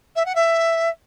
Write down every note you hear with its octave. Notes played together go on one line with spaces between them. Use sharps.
E5
F#5
E5